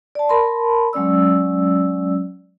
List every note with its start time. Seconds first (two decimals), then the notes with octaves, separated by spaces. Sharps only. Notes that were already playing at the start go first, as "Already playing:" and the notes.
0.15 D5 A5
0.29 A#4 A5 B5 C6
0.93 F#3 G#3 C#4 D5 E6